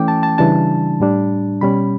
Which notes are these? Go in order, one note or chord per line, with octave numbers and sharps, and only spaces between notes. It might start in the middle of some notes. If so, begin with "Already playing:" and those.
Already playing: E3 A3 C#4 G5 D6
A5
A5
C#3 E3 G3 D4 A5
A2 G3 D4
B2 G3 C#4 B5